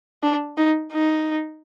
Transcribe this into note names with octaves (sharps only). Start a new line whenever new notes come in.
D4
D#4
D#4